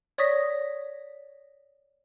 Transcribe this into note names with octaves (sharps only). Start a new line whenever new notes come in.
C#5 D5 C#6 D#6 A#6 B6